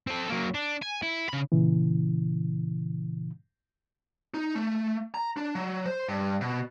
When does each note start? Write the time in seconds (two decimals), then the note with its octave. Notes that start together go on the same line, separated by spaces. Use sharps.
0.07 C4 A4
0.30 F#3 A#3
0.54 D4
0.82 G#5
1.02 E4
1.29 C#3 B5
1.52 A#2 C#3 E3
4.34 D#4
4.55 A3
5.14 A#5
5.37 D4
5.55 F#3
5.86 C5
6.08 G2
6.41 B2